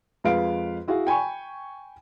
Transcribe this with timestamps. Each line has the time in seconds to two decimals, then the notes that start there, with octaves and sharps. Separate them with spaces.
0.24 F2 G#3 F4 B4 F5 D7
0.88 E4 F#4 G#4 F5
1.07 G5 G#5 B5 C#6